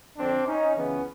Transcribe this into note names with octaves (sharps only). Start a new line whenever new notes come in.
F2 D3 C4 D4
C#4 D#4
C#2 C#3 E3 B3 C#4